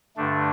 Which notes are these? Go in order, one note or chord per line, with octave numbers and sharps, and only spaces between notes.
G2 D3 A3 D4